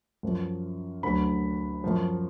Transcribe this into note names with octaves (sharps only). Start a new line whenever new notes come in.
F#2 F3
D2 D3 F#3 B5
F#2 F3